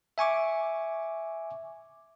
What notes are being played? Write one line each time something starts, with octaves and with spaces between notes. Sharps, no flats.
E5 G#5 C#6 D6